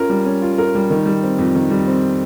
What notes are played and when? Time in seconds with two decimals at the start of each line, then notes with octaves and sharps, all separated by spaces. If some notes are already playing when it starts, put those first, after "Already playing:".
Already playing: C#4 F4 A#4
0.09 G3
0.25 C#4
0.42 F4
0.58 A#4
0.75 G3
0.90 D#3
1.06 G3
1.23 C4
1.38 F2
1.55 D#3
1.70 G3
1.87 C4